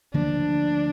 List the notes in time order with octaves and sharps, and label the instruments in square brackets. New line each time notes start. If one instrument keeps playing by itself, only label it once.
[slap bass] D2 D3 F3 A#3 [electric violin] D4